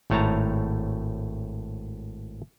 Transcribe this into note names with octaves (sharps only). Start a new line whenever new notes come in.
G#1 A2 A3 C#5 A5 A#5